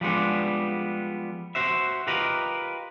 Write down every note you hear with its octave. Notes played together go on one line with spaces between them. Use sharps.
F3 G3 G#3 B3 D4
F#4 C5 E5
F4 G4 A#4 B4 D#5 F5